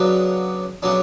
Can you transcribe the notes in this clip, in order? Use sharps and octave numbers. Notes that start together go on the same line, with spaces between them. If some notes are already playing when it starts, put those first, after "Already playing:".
Already playing: C#3 F#3 B3 D4
C#3 F#3 B3 D4